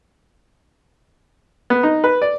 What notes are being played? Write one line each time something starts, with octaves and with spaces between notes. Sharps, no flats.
B3
D#4
B4
D5